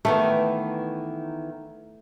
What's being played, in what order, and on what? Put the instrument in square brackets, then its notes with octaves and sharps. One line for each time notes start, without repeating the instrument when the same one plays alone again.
[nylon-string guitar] D#3 E3 B3 [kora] A3